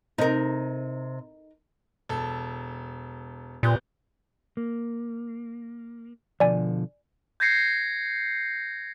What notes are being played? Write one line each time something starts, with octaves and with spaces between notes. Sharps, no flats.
C3 D#4 A#4
E1 A4
D#1 A#2 B3 G6
A#3
B2 D3 F3 D5 G#5
G6 G#6 A#6 C7 C#7